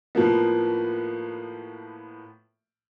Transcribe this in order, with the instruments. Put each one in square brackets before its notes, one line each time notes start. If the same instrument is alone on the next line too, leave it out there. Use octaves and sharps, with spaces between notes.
[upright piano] A2 F3 A#3 B3